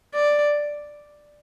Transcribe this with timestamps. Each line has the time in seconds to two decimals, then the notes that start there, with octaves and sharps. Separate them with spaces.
0.14 D5